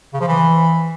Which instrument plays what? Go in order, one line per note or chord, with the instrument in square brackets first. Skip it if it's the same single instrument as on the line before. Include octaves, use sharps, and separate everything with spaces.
[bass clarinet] C#3
F3
E3